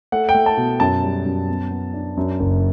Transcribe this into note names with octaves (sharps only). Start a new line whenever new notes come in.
A3 F#5
G5
A3
A5
B2
F#2 A5
G3
F#2
B3
B3
D4
F#2
F#1